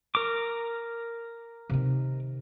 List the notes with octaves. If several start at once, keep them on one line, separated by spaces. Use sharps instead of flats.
A#4 D6
C3 D#3